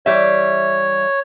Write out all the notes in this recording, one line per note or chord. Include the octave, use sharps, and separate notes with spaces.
E3 G3 C#5 E5